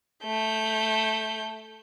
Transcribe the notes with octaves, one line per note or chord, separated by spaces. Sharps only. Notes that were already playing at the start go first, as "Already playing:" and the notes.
A3 G6